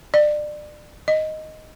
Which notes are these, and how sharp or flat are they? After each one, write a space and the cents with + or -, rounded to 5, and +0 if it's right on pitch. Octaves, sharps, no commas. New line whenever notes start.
D5 +25
D#5 +5